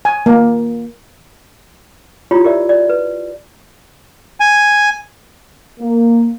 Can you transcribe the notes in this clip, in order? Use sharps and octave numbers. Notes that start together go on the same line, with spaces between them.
G#5
A#3
E4 F4 G4 C#5 B5
G4 A#4 D5 E5
D5
B4
G#5
A#3